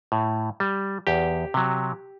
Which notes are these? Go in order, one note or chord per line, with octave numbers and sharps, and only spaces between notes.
A2
G3
E2 G4
C3 F#3